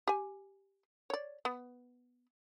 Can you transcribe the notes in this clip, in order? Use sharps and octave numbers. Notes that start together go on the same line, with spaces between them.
G4 G#5
C#5 D5
B3